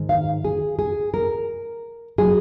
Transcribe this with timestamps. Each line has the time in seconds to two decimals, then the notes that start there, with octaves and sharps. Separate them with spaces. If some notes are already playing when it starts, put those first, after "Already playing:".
Already playing: G#2 D#3 G#3
0.09 F5
0.45 G#4
0.79 G#4
1.14 A#4
2.18 F#3 G#4